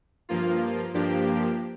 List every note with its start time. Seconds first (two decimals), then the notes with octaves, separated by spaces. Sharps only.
0.29 G2 F3 A#3 F4
0.94 G2 F3 A#3 D4 G4